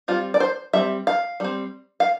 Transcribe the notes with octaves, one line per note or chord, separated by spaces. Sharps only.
G3 C4 F4
D5
C5
G3 C4 E5
F5
G3 C4
F5